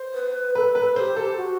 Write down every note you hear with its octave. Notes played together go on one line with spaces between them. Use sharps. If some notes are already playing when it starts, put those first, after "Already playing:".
Already playing: C5
B4
A4 B4
B4
G4 A4 C5
A4
F#4